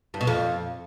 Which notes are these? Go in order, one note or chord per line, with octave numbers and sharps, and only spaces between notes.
G2
B2
F2